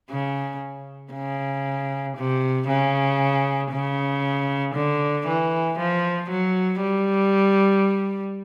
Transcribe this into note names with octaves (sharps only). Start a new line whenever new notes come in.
C#3
C#3
C3
C#3
C#3
D3
E3
F3
F#3
G3